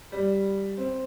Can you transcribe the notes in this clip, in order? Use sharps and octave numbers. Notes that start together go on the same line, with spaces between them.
G3
C4